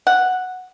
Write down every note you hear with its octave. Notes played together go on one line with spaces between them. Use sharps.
F#5